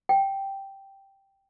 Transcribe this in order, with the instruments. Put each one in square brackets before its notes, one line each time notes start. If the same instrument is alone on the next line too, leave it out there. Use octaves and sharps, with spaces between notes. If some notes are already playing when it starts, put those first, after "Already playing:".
[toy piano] G5